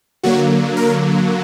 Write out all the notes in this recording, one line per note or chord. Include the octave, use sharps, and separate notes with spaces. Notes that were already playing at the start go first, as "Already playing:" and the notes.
D3 F#3 A#3 F#4
A#4